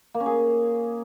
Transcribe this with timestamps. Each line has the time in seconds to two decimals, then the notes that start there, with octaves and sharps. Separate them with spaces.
0.14 A#3
0.20 C#4
0.26 G#4